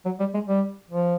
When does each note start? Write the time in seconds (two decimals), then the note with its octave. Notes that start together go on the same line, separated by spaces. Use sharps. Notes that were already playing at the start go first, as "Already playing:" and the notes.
0.05 F#3
0.20 G3
0.34 G#3
0.48 G3
0.90 F3